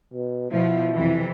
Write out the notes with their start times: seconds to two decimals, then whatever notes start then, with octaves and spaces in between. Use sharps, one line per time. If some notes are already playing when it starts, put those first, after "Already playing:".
0.14 B2
0.51 B2 F3 E4
0.94 F2 C3 E3